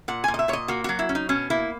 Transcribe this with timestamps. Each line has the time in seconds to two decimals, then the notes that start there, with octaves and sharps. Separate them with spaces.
0.08 A#2 F#5
0.24 A#2 G#5
0.34 D#5
0.39 E5
0.48 A#2 C#5
0.53 D#5
0.68 A#3 F#4
0.84 F#3 F#4
0.99 E4
1.09 C#4
1.15 D#4
1.29 B2 C#4
1.50 A#3 E4